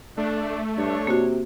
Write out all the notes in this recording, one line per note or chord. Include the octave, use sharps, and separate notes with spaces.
A3 D4
G2 D4 C#5
C3 A#3 F#4